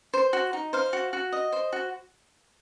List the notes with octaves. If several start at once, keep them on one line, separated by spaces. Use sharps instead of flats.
C5
F#4
D#4
C5 F5
F#4
F#4
D#5
C5
F#4